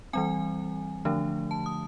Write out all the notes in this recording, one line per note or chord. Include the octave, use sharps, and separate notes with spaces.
E3 G3 C4 G#5
D3 F3 A3 D4
A5
D#6